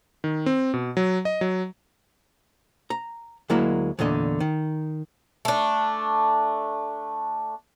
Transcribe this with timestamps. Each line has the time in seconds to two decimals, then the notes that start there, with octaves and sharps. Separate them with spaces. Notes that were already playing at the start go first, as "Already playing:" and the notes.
0.24 D#3
0.46 C4
0.74 B2
0.97 F#3
1.25 D#5
1.41 F#3
2.90 A#5
3.50 D2 F#3 G#3 A#3 E4 A#5
3.99 E2 A#2 D3 D#5
4.40 D#3
5.45 A3 D4